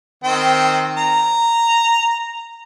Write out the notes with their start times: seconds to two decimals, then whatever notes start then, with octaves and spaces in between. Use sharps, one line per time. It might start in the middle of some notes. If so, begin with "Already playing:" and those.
0.24 D#3 C4 G5
0.97 A#5